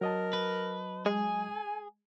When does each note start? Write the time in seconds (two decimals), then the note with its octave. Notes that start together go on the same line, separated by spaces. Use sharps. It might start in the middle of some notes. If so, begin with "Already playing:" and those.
0.01 F#3 A#4 D#5 A5
0.33 B4
1.06 G#3 G#4 G#5